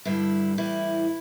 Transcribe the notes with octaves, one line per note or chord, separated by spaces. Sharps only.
G2 D3 G3 E4
A2 E3 G3 E4